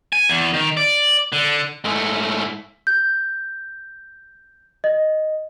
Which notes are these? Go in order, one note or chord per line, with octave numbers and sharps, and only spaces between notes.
G#5
E2
D#3
D5
D3
G#2 A3
G6
D#5